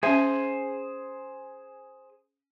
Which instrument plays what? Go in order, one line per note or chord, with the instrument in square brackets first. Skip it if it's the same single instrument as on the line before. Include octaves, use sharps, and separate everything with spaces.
[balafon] C#4 E5 [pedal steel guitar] G#4 C5 G#5